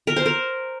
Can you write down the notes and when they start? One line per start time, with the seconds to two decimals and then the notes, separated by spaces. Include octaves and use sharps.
0.07 A#4
0.16 C5
0.26 A#4